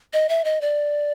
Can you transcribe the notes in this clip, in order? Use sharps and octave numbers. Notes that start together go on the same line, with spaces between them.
D#5
E5
D#5
D5